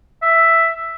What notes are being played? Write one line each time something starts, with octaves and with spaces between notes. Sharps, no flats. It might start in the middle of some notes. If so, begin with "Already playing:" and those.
E5